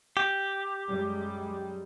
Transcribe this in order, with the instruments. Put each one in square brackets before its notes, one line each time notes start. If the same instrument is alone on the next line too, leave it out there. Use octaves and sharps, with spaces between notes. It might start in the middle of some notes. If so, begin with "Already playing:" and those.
[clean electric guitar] G4
[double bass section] F#2 G3 G#3